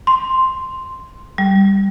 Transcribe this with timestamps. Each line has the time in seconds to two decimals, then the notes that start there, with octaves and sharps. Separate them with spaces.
0.07 C6
1.38 G3